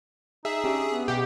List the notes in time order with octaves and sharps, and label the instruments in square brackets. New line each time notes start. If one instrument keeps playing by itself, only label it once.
[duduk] D#4 [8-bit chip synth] G#4 [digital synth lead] E5
[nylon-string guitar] C#4 D4 G4
[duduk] B3
[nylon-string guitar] B2 F#5 [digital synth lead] G4